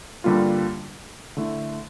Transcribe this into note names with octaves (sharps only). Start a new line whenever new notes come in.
G2 D3 G3 A#3 F4
D3 A3 E4